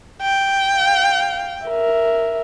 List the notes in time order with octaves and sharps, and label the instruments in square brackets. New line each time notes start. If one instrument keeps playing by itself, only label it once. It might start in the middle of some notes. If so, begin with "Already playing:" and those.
[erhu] G5
[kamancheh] F5
A#4 E5